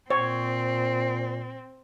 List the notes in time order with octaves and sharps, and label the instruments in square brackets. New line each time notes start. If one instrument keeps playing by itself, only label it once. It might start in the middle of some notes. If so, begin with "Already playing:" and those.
[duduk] A#2 [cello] C4 [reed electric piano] C5 C#6 [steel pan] C#5